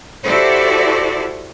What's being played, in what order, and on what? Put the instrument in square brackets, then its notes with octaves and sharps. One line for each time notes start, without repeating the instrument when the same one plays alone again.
[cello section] E4 F#4 G4 A4 C5 D5